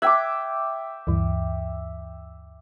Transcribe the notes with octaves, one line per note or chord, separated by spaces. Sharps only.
E5 G5 D6 F#6 G#6 B6
D2 G2 E3